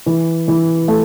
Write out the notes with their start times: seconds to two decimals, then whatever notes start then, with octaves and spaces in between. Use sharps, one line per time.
0.06 E3
0.48 E3
0.88 A3